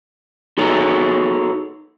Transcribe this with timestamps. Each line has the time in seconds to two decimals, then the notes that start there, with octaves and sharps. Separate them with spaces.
0.58 D#4 F#4 G#4 A4 C#5